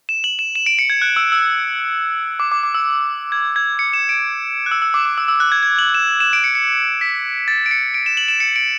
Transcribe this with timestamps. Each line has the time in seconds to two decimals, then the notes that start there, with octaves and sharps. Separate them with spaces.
0.09 E7
0.24 F#7
0.39 E7
0.55 E7
0.66 D7
0.79 C#7
0.90 G#6
1.02 F#6
1.16 E6
1.32 E6
2.40 D6
2.52 D6
2.63 D6
2.75 E6
3.32 G#6
3.56 G#6
3.79 C#7
3.93 E7
4.09 D7
4.66 F#6
4.71 E6
4.82 E6
4.94 D6
5.05 D6
5.18 E6
5.28 E6
5.40 F#6
5.52 G#6
5.63 G#6
5.79 F#7
5.94 E7
6.20 E7
6.33 D7
6.44 C#7
6.55 C#7
7.01 B6
7.48 A6
7.66 D7
7.71 C#7
7.94 D7
8.06 E7
8.17 F#7
8.28 E7
8.40 C#7
8.56 D7